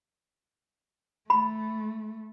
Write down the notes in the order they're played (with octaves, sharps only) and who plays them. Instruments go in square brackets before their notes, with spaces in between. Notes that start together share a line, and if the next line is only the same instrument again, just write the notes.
[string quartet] A3 [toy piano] B5